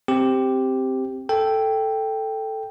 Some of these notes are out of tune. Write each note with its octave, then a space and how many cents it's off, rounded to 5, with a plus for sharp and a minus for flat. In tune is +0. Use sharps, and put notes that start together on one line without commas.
C4 +0 G4 +0
A4 +0 G5 +0